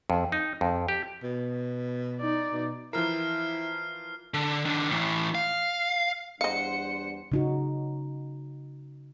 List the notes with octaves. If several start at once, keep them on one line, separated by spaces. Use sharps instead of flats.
F2
D#4
F2
G4
B2
D#4 D5
B2
E3 F3 E4 A#4 F6 C7
D3
D#3 D4
A2 E3
F5
E2 G3 D4 C5 D#5 F5 F#5 C#7
C#3 D#4 F#4